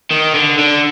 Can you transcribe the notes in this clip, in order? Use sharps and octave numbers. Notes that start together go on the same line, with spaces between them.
D#3
D3
D3